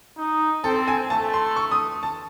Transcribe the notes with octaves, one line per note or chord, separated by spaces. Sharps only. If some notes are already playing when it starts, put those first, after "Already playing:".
D#4
C4 A4
G#5
A3 A5
C6
C#6
D#6
A5